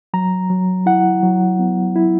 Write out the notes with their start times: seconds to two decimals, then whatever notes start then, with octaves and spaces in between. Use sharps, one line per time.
0.14 F#3 A#5
0.50 F#3
0.86 E4 F#5
1.23 F#3
1.59 B3
1.96 E4